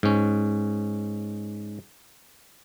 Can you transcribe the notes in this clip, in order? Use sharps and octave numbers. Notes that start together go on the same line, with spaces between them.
G#2 C#4